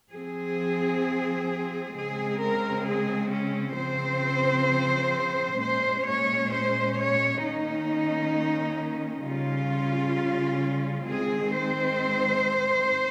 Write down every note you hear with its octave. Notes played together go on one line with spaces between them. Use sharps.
F3 C4 G#4
C#3 G#3 C4 G#4
A#4
G#4
C#4
C#3 F3 C4 C5
A#2 G#3 C#4 C5
C#5
C5
C#5
D#3 A#3 C#4 D#4
C#3 G3 C#4 F4
D#3 G#3 C4 G#4
C5